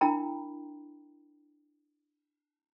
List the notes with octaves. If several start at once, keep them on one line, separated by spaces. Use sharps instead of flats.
D4 E4 A#4 G5 A#5 B5